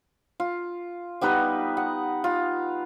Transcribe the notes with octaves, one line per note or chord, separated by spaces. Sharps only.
F4
G3 B3 D#4 B4
F#5
F4